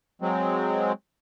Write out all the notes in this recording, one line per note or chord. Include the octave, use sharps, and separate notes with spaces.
F#3 G#3 C4